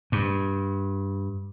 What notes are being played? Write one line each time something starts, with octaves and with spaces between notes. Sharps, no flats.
G2